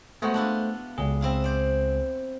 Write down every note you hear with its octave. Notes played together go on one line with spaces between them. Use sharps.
G#3 A3 B3 F#4 C5
D4 E4 F4
C#2 G#4
C4 E4 F5
C5 D5